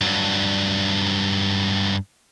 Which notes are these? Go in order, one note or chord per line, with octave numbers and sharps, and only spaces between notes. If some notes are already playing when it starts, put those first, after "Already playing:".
G2 F#3